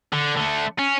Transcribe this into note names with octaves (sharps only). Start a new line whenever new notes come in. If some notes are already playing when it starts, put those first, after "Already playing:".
D3
D3 A3
C#4